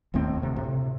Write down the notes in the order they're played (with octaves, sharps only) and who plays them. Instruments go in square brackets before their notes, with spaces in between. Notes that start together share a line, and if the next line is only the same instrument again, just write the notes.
[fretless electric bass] E1 D#2 A2 C4
D2 C3
A2 C3